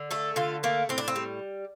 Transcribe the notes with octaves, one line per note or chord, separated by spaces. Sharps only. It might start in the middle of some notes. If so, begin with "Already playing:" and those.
Already playing: D3
A3 A4
D3 F4
A3 A#3
A2 C4
D4
C4
G3